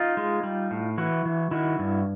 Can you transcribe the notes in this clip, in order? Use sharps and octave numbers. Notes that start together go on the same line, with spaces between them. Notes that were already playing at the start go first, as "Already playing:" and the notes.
Already playing: D#4 F4
G#3
G3
A2
E3 E4 F#4
E3
D#3 E4 F#4
G2